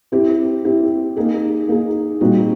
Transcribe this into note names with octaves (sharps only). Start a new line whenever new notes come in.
C4 E4 G4
C4 E4 G4
A#3 D#4 G#4
A#3 D#4 G#4
A#2 G3 C4 D#4 F#4